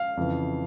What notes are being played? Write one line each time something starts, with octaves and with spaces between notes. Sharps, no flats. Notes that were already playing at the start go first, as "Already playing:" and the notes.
Already playing: F5
F2 C#3 E3